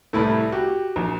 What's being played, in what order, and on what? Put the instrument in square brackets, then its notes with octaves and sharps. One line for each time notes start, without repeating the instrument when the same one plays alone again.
[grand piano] C2 A2 [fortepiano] A3 E4 B4
[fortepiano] F#4 [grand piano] G4
[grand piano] A#1